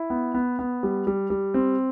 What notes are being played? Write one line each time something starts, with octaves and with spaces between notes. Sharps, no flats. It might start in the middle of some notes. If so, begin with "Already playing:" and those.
Already playing: E4
B3
B3
B3
G3
G3
G3
C4